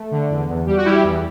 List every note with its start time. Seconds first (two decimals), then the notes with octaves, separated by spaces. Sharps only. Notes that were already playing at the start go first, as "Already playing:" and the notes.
Already playing: A3
0.11 D3
0.30 E2
0.49 E2
0.67 G3 G4
0.77 F#4
0.85 G3 E4 G4
1.04 E2